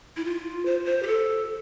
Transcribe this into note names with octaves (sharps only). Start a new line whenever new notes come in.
E4
F4
C5
C5
G4
A4